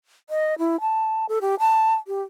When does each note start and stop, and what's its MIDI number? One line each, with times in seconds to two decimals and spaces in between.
0.30 0.55 75
0.59 0.80 64
0.81 1.26 81
1.29 1.39 69
1.41 1.55 67
1.60 1.94 81
2.07 2.22 67